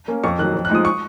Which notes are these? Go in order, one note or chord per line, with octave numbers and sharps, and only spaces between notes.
A#3 C#4
F2 C#6
D#3 F#3 F#6
F2
F#6
F3 G#3 D#4 D#6
C#6